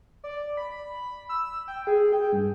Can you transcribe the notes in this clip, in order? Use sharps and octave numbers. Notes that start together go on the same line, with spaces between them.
D5
B5
E6
G5
G#4
G5
G2